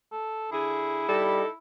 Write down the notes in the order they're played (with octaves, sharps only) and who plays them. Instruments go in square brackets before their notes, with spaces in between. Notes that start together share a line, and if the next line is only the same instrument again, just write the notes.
[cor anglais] A4
[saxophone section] D3 G#4 [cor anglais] E4
[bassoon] G3 [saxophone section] D#4 A4